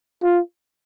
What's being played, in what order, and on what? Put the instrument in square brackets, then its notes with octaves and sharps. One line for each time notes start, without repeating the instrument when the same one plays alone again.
[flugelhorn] F4